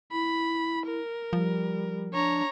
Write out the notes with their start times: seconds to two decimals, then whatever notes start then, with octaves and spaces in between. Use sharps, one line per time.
0.12 E4 B5
0.86 A#4
1.33 F3 G3
2.13 D4 C#5 A#5